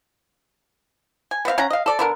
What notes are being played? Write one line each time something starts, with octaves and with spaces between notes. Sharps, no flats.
G#5
B3 C4 E5 F5
C#4 F5 F#5 A#5
D#5 F5
A4 D5
D3 B3 A#4